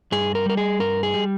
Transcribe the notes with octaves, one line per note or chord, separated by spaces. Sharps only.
G2 G#4
A#4
G3 A#4
G#4
G2 A#4
G#4
G3